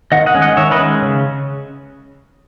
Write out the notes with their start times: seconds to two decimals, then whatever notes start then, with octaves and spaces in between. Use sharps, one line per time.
0.12 D#3 D#5 F#5
0.26 D#5 F#5
0.35 G#3 C#4
0.42 D#5 F#5
0.57 D#3 C#5 E5
0.71 B4 D#5
0.79 G#3 C#4
1.02 C#3